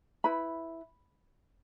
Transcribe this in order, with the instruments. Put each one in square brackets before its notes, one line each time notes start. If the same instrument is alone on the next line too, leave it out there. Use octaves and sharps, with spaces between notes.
[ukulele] E4 B4 B5